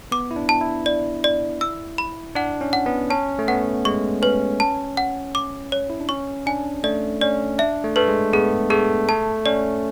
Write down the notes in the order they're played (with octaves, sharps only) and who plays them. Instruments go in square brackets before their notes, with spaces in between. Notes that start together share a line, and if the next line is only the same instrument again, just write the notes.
[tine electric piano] B3 [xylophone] D6
[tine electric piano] E4
D4
[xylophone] A5
[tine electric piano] E4
[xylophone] D5
D5
E6
B5
[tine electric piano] D4 [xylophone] F#5
[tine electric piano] C#4
[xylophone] F#5
[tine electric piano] B3
[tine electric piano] C#4 [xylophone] A5
[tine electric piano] A3
[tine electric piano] B3 [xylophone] F#5
[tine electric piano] G#3 [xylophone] C#6
[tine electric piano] C#4 [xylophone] B4
[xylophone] A5
F#5
D6
C#5
[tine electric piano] E4
D4
[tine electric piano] C#4 [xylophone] C#6
[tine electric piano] D4 [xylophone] G#5
[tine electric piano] A3 [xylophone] D5
[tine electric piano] C#4 [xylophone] D5
[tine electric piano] D4 [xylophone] E5
[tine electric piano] A3
[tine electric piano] A3 [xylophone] B4
[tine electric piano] G#3
[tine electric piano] B3 [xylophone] G#4
[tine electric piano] A3 [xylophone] G#4
[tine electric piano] A3 [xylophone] A5
[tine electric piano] C#4 [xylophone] D5